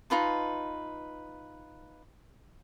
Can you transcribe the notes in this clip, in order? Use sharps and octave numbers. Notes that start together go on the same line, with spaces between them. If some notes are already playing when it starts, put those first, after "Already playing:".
D#4 F4 B4 A5